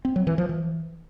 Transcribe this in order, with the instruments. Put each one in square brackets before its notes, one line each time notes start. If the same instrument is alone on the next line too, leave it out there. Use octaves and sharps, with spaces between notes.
[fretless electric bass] C4
F#3
E3
F3
E3